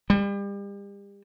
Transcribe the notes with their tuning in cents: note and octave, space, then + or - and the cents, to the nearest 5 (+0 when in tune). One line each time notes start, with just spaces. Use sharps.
G3 +35